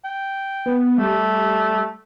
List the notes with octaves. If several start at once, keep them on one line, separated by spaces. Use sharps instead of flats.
G5
B3
G3 A3